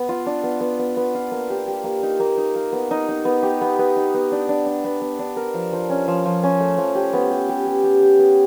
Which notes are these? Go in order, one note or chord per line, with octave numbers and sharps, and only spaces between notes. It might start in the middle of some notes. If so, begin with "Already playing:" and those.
Already playing: B3
F4
D4
B3
B3
B3
B3
F4
A#3
G4
G4
A#3
D#4
A#3
D#4
A#3
B3
D#4
D#4
B3
G4
B3
B3
D#4
B3
D4
D4
D4
B3
B3
D4
A#4
F3
F3
C#4
F3
F3
C#4
A3
F3
G4
B3
G4
G4
G4
G4
G4
B3